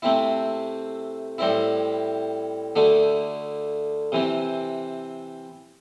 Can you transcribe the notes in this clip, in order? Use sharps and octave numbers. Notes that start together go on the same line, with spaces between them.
C3 A3 C4 E4
A2 G3 C4 E4
D2 D3 A3 D4
C3 E3 C4